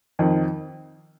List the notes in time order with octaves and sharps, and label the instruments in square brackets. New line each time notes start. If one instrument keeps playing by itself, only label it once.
[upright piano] F2 D#3